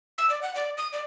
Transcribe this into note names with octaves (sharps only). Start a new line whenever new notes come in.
E6
D5
F#5
D5
D#6
D5